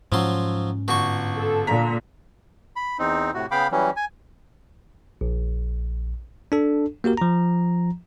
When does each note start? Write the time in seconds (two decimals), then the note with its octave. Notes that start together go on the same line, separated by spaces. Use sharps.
0.12 G#2 F3 F#3 C#4 C6
0.88 G1 F#4 C#6
1.36 A4
1.67 A#2 D3 A#5 B6
2.76 B5
2.99 E2 C4 D#4
3.34 A2 C3 F#4
3.51 C#3 B3 F5 G5 B5 D6
3.72 E3 F#3 G3 C#4
3.96 G#5
5.21 A#1
6.52 D4 A4
7.04 A#3 F#4 G4 A#4
7.17 F3 A#5